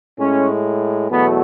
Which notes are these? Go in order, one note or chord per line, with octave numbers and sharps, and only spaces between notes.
A2 G#3 C#4
E2 B2 F#3 A3 B3